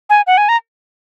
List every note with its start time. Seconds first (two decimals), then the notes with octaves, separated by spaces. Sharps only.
0.10 G#5
0.27 F#5
0.37 G#5
0.49 A#5